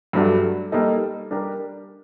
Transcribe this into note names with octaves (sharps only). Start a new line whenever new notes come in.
G2 F#3 A3 D4
G3 A#3 D#4 A4
G3 D4 G4 A#4